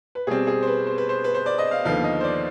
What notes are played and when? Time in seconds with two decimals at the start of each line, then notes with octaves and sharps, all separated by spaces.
0.15 B4
0.27 B2 G3 C4 G#4
0.47 G#4
0.63 C5
0.67 B4
0.87 C5
0.98 B4
1.09 C5
1.24 B4
1.34 C5
1.46 D5
1.58 D#5
1.71 F5
1.85 D#2 D3 F3 B3 F5
2.04 D#5
2.20 C5
2.24 D5